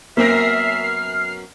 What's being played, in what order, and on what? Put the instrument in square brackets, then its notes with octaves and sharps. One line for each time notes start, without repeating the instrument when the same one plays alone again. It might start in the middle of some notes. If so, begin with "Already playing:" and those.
[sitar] F#2 B3 A#4 [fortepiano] A#3 [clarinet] E5 [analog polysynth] F6 C7